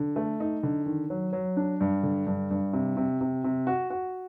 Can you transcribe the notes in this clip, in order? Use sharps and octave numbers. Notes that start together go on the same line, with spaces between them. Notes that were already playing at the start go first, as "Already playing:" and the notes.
Already playing: D3
A3
D#4
D3
D#3
F#3
F#3
D4
G2
D3
G2
G2
C3
C3
C3
C3
F#4
F#4